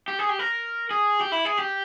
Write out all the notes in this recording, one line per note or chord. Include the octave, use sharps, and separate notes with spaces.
G4
G#4
G4
A#4
G#4
G4
E4
G#4
G4